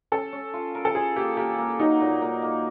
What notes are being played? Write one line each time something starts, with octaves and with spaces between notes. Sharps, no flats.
C#4 A4
C#4
F4
A#4
A4
F4 G#4
A#3 G4
A#3 G4
A#3
F#3 D#4
A#2
A#3
A#3